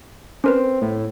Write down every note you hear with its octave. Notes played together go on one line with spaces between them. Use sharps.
C4 C#4 A#4 B4
A2